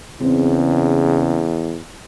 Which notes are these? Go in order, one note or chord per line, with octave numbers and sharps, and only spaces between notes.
E2 C#3 C4